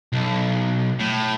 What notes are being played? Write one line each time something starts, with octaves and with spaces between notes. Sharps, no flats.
B1
A2